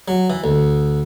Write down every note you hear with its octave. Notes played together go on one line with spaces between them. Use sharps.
F#3
E3
D2